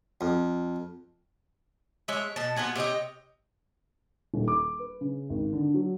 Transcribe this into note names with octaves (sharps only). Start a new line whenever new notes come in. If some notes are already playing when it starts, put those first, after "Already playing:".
F2
G#3 C#5 E5
B2 A5
B3 F4 F#4 G#4
C3 C#5 D#5 G5
D#1
D6
B4
C#3
G#1
D3
F#3